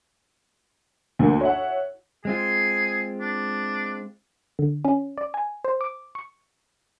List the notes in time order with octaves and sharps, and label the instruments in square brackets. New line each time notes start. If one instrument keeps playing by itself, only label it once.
[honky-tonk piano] D2 A#3
C#5 E5 F#5
[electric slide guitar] G#3 C4 F4 [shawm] G#4
[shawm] D4
[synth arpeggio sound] D3
C#4
D5
G#5
C5
D6
C#6